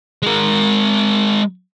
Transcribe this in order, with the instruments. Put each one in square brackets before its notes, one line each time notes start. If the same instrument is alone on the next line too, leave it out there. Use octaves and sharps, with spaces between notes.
[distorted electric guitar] G#3 A#4